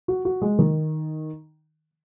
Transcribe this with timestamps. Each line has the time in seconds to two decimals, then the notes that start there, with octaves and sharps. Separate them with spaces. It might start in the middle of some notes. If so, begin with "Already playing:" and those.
0.08 F#4
0.25 F#4
0.42 G#3
0.59 D#3